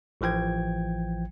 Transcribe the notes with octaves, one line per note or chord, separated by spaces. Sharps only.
A1 E3 F3 G5 G#6